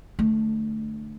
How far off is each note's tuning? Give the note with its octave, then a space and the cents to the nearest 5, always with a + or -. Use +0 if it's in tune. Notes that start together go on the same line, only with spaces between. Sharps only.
D3 +20 A3 -5